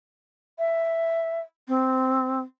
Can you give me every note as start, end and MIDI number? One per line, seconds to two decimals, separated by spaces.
0.59 1.40 76
1.68 2.39 60